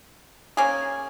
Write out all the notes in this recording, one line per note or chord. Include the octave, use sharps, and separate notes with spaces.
A#3 C#4 G#4